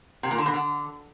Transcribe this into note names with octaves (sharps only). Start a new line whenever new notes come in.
C3
A#2
D3
B2
D3